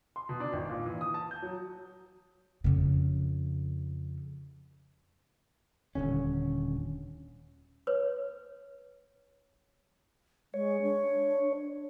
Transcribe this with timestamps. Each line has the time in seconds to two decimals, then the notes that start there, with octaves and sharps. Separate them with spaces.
0.16 C6
0.29 B2
0.40 D4
0.53 G#1
0.69 A#2
0.86 E3
1.01 D#6
1.14 A5
1.31 G6
1.42 F#3
2.64 F2 C#3
5.95 D#1 C#2 D3 C#4
7.87 B4 C#5
10.54 G#3 C#5
10.82 D4